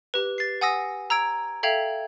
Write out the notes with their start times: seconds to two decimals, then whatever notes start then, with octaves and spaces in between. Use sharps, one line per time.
0.14 G4 B4
0.38 A6 C7
0.61 F#5 G#5 D#6 E6 A#6
1.10 A#5 E6 G#6 D7
1.63 A4 E5 F5 G5 G#6 F7